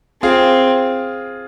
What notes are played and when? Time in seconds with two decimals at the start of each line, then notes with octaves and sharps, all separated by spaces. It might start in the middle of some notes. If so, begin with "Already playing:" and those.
0.23 C4 F4 G#4